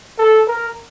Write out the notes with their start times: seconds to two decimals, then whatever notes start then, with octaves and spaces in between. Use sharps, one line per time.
0.18 A4
0.47 A#4